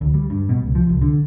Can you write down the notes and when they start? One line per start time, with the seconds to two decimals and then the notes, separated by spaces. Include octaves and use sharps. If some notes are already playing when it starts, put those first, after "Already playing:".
0.01 D2
0.14 G3
0.30 G2
0.49 B2
0.63 C#2
0.75 F3
0.89 C2
1.02 D3